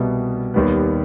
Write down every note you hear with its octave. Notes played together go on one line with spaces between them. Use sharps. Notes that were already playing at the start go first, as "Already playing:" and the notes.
Already playing: C2 B2 G3 B3
D#2 D#3 G3 B3